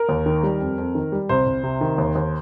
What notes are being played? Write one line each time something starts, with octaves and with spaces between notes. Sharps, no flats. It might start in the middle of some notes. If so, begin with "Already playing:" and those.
Already playing: A#4
D#2
D#3
G3
F2
F2
D#3
G3
C2 C5
C2
C3
D#3
D#2
D#2